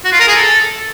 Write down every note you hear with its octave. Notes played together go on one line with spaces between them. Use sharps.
F#4
F4
A#4
G#4
A4